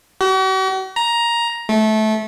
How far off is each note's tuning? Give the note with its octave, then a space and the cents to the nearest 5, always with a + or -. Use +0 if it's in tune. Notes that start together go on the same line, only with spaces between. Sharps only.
F#4 +45
A#5 +10
A3 -20